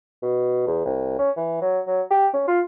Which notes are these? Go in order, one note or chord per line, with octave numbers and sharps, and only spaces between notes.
B2
E2
C2
C#4
E3
F#3
F#3
G4
C#4
F4